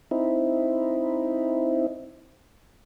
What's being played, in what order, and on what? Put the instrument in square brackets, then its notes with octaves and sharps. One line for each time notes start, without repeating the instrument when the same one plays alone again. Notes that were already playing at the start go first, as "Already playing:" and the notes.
[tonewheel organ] C4 D#4 E4